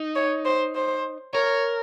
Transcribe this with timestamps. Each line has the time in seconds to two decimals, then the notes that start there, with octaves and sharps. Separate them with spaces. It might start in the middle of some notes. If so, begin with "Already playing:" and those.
Already playing: D#4
0.16 C#5
0.45 C5
0.75 C5
1.34 A#4 C#5